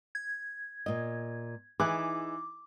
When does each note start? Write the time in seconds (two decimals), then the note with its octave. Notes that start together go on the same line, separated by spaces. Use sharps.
0.15 G#6
0.86 A#2 D#5
1.80 E3 D#4 E4 G#4 D6 F#6